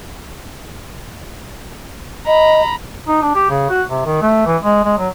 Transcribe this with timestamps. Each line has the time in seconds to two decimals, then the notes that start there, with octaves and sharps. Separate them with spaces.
2.27 D#5 A#5 B5
3.08 D#4
3.22 D4
3.35 G4
3.50 C#3
3.70 F#4
3.90 C3
4.06 D#3
4.22 A3
4.46 E3
4.63 G#3
4.84 G#3
4.98 F#3